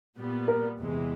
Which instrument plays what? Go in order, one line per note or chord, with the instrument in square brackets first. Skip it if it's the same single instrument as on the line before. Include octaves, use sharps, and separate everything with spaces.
[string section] A#2 G3 B3
[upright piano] A#4
[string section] E2 C3 E3 G#3